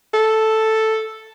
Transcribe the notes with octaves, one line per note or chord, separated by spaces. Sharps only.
A4